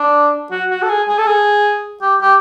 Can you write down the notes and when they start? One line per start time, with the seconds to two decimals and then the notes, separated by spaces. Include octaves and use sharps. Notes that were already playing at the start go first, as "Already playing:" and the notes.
Already playing: D4
0.51 F#4
0.71 F#4
0.82 A4
0.89 G#4
1.08 G#4
1.18 A4
1.27 G#4
2.02 G4
2.21 G4